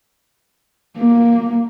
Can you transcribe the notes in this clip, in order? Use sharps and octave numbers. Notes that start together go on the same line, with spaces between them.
A#3